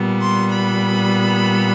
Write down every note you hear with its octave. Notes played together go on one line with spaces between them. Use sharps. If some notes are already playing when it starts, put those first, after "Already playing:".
Already playing: A#2 G3 B3
C6
B5